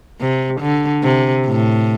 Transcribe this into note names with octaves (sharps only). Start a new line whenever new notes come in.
C3
D3
C3
A2